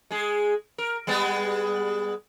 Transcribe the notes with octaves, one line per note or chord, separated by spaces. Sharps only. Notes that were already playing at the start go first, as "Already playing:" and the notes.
G#3 G#4
A#4
G3 G#3 B3